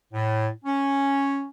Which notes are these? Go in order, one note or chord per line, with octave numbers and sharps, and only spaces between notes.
A2
C#4